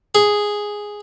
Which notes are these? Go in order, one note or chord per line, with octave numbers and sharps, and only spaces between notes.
G#4